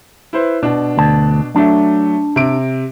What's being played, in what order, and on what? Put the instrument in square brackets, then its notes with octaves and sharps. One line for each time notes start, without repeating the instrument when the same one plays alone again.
[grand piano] E4 B4 C5
B2 D4
[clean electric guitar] D2 A5
[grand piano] F#3 A3 [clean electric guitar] D4
[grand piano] C3 D7